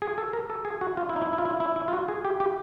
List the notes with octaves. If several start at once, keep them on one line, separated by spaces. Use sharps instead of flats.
G#4
A4
A#4
A4
G#4
F#4
F4
E4
D#4
E4
E4
F4
E4
E4
E4
F4
F#4
G#4
G4
G4